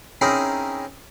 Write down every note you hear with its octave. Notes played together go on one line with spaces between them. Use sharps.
C4 C#4 D#4 E4 G#4 A#4